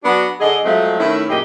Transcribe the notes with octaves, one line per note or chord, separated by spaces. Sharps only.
F#3 B3 D4 F#4
D3 G#4 D#5
F3 F#3 G#3 A3 C4
D#3 A3 C#4 E4
F#2 A#2 A#3 G4 G#4 D#5